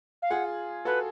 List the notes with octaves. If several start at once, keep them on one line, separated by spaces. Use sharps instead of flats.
F5
F4 G#4 F#5
F#4 A4 B4